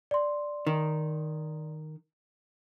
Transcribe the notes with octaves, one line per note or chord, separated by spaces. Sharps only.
D5 C6
D#3